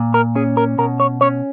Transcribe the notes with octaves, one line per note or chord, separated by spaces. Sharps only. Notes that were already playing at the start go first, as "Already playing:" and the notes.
Already playing: A#2
A#4
C#4 G#4
A#4
B2 A#4
C#5
C#4 C#5